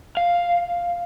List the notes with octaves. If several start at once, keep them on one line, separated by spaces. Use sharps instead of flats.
F5